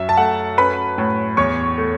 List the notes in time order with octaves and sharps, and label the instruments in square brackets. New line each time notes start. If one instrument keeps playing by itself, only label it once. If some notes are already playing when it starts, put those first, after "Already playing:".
Already playing: [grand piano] F#2 E5
A5
A3 F#5
C#4 B4 B5
A2
E2 C#5 C#6
A3